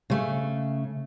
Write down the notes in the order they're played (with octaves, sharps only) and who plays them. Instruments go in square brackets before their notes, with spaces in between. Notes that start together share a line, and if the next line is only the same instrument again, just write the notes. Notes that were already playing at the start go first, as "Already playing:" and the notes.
[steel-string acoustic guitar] C#3 A3